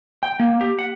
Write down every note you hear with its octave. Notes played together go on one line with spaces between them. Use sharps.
G5
A#3
G4
F#5